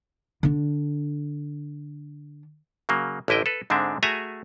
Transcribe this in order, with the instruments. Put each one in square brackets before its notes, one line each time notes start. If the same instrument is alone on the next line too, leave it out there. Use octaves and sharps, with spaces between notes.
[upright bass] D3 D4
[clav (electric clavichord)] C#3 F#3 A#3
A1 D3 E4 D#5 G5
A4 B4
G#2 D3 G#3 C4 D4 E5
A3 F#4 G#4 E5 G#5 A#5